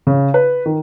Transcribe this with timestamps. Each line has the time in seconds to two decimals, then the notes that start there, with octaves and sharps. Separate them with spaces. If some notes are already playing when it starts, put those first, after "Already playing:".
0.07 C#3
0.34 B4
0.66 D#3